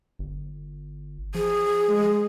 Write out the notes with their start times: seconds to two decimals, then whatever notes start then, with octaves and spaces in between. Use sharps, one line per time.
0.19 G1
1.35 F3 G#4
1.89 G#3